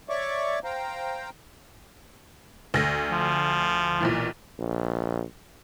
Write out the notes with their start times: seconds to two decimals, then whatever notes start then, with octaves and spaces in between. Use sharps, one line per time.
0.09 C#5 D5 E5 C#6 D6
0.64 C5 F5 G5 A#5
2.74 D2 A#6
3.12 F3
4.01 B1 A#2 E3
4.59 A#1